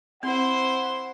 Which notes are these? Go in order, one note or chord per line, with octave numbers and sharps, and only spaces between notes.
C4 E4 C5 F#5 C6